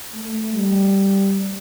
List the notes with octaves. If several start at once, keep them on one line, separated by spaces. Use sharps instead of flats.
A3
G3